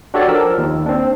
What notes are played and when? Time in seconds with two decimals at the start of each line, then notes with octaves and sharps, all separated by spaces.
0.14 D4 F#4 G4 A4 C#5 D5
0.28 F3 A#4 E6
0.58 D#2
0.86 C4 D4